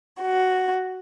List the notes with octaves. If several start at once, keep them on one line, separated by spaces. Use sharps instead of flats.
F#4